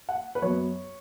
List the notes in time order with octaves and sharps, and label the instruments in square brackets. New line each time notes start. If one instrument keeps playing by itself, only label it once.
[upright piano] F#5
B4
F#2 F#3 B3 C#5